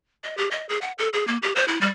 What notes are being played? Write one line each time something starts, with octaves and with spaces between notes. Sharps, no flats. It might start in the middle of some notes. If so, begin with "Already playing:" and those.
D#5
G4
D#5
G#4
F#5
A4
G#4
A#3
G4
C5
E4
G3